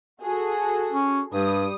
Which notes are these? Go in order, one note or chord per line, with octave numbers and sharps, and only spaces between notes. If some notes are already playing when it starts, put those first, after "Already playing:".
F#4 G#4 A4
C#4
G2 G3 D#6